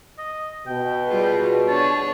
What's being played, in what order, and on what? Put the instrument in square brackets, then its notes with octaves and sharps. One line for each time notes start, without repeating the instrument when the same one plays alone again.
[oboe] D#5
[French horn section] B2 [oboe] G5
[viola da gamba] G3 F4 [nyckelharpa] G#4
[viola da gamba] D4 G#4 [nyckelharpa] C#5 [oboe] A5